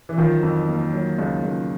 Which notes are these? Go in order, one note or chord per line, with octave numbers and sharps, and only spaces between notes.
E3
D#3 F3 F#3
F2
A#3
F#3
C#2
C#2